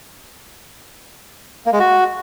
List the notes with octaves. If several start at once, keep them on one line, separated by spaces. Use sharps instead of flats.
A#3
G#3
F#4